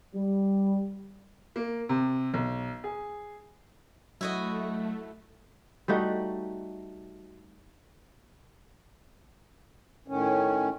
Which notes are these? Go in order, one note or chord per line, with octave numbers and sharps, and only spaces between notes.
G3
A#3
C3
B1
G#4
F#3 A3 E4 F#4 D#5
G3 A3 D#4 F#4
A2 D#3 C#4